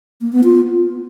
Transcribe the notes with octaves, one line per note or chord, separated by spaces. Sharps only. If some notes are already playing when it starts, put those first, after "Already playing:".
A#3
B3
F4